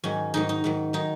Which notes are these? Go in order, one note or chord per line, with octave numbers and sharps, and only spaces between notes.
G#2 D#3 F#3 C#4
G#2 D#3 F#3 D#4
D#4
G#2 D#3 F#3
D#3 F#3 D#4